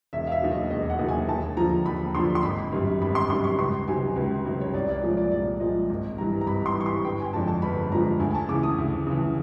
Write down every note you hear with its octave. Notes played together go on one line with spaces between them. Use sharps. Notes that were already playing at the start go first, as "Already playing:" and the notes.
E1 E5
F5
E5
D#2 D#3 F#3
D#5
E1 D#5
F#5
D#2 D#3 F#3
G#5
D#2 A5
D3 F3 A#5
D#2 B5
D3 F3 C6
C6
G#1 B5
F#2 D#3 G3
G#1 B5
C6
F#2 D#3 G3 C6
C#6
C#2 C6
C3 D#3 F#3 G#5
C#2
C3 D#3 F#3
C#5
C2 D5
D5
A#2 F3 G#3
D5
C2 D5
A#2 F3 G#3 D#5
G#1
G2 E3 G3 A#5
A#5
G#1 B5
C6
G2 E3 G3 C#6
C6
G1 G5
G#5
F2 D3 F3 G#3 A5
A5
G1 B5
F2 D3 F3 G#3 A#5
D2 G#5
G#5
A5
C#3 E3 D6
D#6
D2
C#3 E3